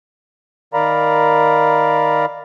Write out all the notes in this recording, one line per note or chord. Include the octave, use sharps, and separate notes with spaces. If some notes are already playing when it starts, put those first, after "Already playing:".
D#3 A#4 D5 F5 A#5 B5